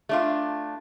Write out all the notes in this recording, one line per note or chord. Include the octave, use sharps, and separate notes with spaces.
A3 D4 F4